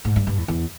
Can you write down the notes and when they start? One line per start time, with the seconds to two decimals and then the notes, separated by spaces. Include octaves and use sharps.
0.05 G#2
0.16 G2
0.27 G2
0.38 E2
0.48 E2